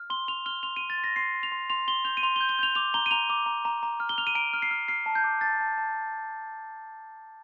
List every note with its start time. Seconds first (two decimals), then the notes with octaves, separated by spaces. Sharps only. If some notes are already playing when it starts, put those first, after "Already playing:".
Already playing: F6
0.10 C6 G7
0.28 C6 F7
0.46 F6 G7
0.63 C6 F7
0.76 C6 D#7
0.90 A6
0.98 C6
1.04 A#6
1.16 C6 C7
1.35 C6
1.43 F7
1.52 C6
1.70 C6 F7
1.88 C6 G7
2.05 G6 F7
2.17 D#7
2.23 C6 F7
2.36 G7
2.41 G6
2.49 G7
2.59 G6 F7
2.75 D6 F7
2.94 A#5 G7
3.06 D#7
3.11 A#5 F7
3.30 D6
3.46 A#5
3.65 A#5
3.83 A#5
4.00 F6
4.09 G7
4.18 F6 F7
4.27 D#7
4.35 A#5 D7
4.53 F6
4.62 C7
4.71 F6
4.88 F6 C7
5.06 A5
5.15 G6
5.24 D6
5.41 A5 A6
5.60 A5
5.77 A5